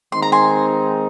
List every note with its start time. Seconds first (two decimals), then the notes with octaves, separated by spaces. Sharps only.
0.12 D#3 G#3 C4 D#4 C6
0.22 A#5
0.32 G#5 C6